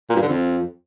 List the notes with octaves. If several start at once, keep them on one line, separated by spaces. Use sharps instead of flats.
A#2
G2
D3
F2